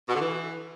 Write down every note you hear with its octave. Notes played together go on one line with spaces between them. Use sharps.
B2
D3
E3